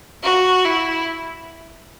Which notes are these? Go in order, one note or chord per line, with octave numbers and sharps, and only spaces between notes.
F#4
E4